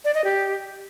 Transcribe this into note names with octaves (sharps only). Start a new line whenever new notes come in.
D5
D#5
G4